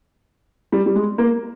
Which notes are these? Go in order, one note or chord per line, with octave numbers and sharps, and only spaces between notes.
G3
G3
G#3
A#3